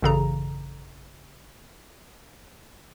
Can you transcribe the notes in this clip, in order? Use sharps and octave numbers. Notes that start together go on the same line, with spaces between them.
A1 F#2 C#3 A4 A#5